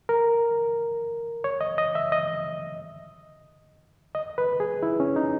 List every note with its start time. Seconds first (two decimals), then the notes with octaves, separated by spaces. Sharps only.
0.09 A#4
1.44 C#5
1.61 D#5
1.78 D#5
1.95 E5
2.12 D#5
4.15 D#5
4.38 B4
4.60 G#4
4.83 E4
5.00 C#4
5.16 D#4